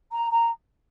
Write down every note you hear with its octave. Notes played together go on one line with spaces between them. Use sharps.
A#5
A#5